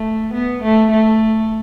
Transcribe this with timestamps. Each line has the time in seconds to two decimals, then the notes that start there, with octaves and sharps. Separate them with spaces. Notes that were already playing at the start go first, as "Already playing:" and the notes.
Already playing: A3
0.33 B3
0.63 A3
0.91 A3